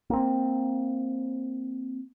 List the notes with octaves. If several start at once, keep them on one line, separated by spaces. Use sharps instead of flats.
A#3 C4